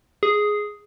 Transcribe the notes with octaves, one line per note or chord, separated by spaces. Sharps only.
G#4